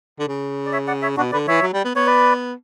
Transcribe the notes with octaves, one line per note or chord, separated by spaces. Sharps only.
D3
C#3
D5
C#5 E5
D5 F#5
C#5 E5
B2 D4 F#4
D3 B4 D5
E3 C#5 E5
F#3
G3
B3
B3 C#5
B4 D5